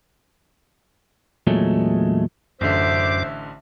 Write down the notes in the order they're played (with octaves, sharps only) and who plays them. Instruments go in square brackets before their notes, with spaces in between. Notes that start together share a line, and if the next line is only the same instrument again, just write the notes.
[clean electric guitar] E2 A#2 F#3 G#3 A3 C#4
[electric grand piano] A1 D3 [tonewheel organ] F#2 D6 [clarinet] C5 [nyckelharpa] E5